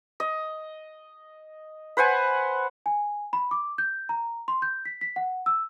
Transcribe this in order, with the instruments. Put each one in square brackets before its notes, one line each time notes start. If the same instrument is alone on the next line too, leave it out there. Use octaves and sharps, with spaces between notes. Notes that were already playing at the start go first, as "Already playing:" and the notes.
[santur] D#5
B4 C5 F#5 G#5
[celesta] G#5
B5
D6
G6
A#5
C6
G6
B6
B6
F#5
E6